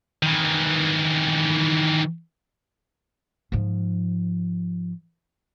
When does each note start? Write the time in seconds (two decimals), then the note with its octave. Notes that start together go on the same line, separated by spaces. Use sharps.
0.23 D#3 E3
3.52 G#2 F3